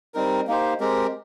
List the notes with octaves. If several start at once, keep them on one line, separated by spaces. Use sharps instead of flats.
G3 C4 D#4 A#4
A#3 D#4 G4 C5
G#3 C4 G4 A#4